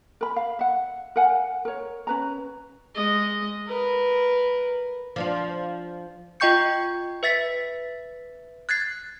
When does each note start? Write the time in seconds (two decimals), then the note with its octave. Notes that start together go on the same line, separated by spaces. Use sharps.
0.21 A#4 B5
0.36 F5
0.59 E5 F#5
1.16 A#4 F5 F#5 G#5
1.65 A#4 C#5
2.07 C#4 B4 A#5
2.96 G#3 D#5
3.67 A#4 B4
5.16 F3 D4 F4
6.40 F4 D#5 G5 C#6 G6 C#7
7.23 B4 E5 A6 B6
8.69 F#6 G#6 A6 C7